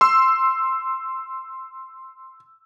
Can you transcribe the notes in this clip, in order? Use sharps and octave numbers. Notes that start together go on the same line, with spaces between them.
C6 E6